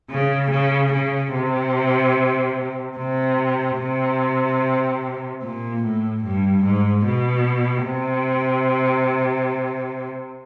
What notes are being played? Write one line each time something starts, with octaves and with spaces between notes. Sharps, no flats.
C#3
C#3
C#3
C3
C3
C3
A#2
A2
G2
G#2
B2
C3